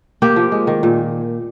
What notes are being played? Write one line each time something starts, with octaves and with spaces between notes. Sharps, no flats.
A#3 G4
F3
G#3
D#3
A#2